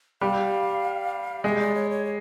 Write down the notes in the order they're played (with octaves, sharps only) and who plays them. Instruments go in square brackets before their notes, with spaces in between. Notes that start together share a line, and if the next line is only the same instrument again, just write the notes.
[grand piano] G3 [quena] F5
[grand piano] G#3 [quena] E5
[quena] D5
C#5
C#5
C#5